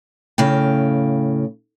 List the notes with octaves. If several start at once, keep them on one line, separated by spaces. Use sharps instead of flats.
A2 C#3 F5 G5